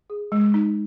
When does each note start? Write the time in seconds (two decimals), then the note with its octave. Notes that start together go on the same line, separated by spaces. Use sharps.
0.10 G#4
0.32 G#3
0.54 D#4